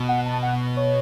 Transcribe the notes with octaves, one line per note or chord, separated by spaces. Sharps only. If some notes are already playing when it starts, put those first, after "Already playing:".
Already playing: B2
F#5
A5
F#5
C#5